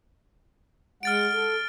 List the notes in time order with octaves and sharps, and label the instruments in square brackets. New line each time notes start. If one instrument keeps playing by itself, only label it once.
[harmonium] G#3 F#5 [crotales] F6 A6 D7
[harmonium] A4